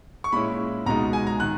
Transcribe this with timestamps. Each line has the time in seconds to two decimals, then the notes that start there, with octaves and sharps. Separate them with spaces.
0.24 C#6
0.32 A#2 G#3 C#4 E4 B5
0.86 C#2 B2 G#3 D#4 A#5
1.13 G#5
1.27 A#5
1.40 D#3 F#6